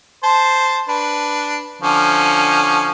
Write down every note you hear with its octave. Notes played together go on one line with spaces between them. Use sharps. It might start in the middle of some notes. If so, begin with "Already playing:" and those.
C5 A5
D4 B4
D3 F3 C#4